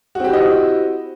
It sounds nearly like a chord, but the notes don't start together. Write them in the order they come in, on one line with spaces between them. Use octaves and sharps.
F#4 C4 G4 E4 D#5